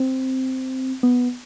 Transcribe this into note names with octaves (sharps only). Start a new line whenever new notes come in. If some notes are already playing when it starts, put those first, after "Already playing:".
Already playing: C4
B3